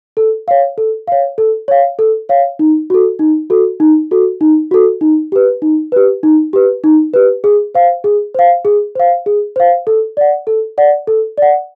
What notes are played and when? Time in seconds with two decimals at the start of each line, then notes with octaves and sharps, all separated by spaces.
0.17 A4
0.48 C#5 F5
0.78 A4
1.08 C#5 F5
1.38 A4
1.68 C#5 F5
1.99 A4
2.29 C#5 F5
2.59 D#4
2.90 F#4 A4
3.19 D#4
3.50 F#4 A4
3.80 D#4
4.11 F#4 A4
4.41 D#4
4.71 F#4 A4
5.01 D#4
5.32 G4 B4
5.62 D#4
5.92 G4 B4
6.23 D#4
6.53 G4 B4
6.84 D#4
7.14 G4 B4
7.44 G#4
7.75 C5 F5
8.04 G#4
8.34 C5 F5
8.65 G#4
8.95 C5 F5
9.26 G#4
9.56 C5 F5
9.87 A4
10.17 D5 F#5
10.47 A4
10.78 D5 F#5
11.07 A4
11.38 D5 F#5